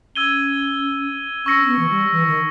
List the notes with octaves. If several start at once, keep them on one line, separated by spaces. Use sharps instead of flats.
C#4 E6 G#6 D#7 G7
C#4 C#6 E6 A#6 C#7
C#4
B3
E3
G3
E3
D#3